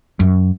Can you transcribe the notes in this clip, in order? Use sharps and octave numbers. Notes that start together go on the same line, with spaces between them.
F#2